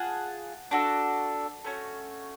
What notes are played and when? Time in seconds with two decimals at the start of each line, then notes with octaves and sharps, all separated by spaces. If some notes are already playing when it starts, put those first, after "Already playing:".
Already playing: F4 G#4 F#5 A5
0.71 D4 F#4 A4
1.65 A3 C#4 F#4